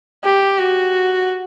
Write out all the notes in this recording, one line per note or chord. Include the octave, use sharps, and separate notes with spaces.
G4
F#4